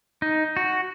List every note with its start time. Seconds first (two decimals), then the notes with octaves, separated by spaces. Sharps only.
0.22 D#4
0.57 F#4